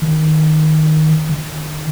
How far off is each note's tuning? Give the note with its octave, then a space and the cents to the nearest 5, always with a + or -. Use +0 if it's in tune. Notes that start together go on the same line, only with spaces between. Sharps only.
D#3 +0
D#3 -40